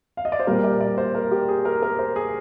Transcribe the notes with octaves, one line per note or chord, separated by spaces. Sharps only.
F5
D#5
D5
C5
A#2 G3 A#3 A#4
D5
D5
C5
A#4
G4
G#4
A#4
A#4
C5
G#4